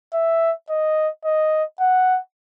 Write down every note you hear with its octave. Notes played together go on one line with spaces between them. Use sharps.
E5
D#5
D#5
F#5